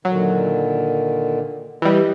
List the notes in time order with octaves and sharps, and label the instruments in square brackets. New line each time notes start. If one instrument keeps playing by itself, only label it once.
[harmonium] A#2 D3 D#3 [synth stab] F#3
[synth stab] E3 G3 [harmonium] D#5